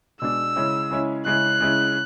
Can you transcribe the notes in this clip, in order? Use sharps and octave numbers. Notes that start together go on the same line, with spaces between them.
B2 G#3 D4 E6
C#3 G#3 C#4 E4
C#3 G#3 C#4 E4
C#3 G#3 C#4 E4 F#6
C#3 G#3 C#4 E4